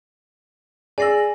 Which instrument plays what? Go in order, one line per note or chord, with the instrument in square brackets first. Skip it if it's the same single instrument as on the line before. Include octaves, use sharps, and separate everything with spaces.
[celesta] G#4 A#6 [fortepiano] D5 E6 [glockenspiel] G#5 C7 F#7